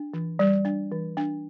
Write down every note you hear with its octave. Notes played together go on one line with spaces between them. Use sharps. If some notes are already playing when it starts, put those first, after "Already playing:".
Already playing: D4
E3
G3
D4
E3
D4